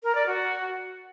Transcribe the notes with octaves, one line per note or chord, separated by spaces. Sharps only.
A#4
D5
F#4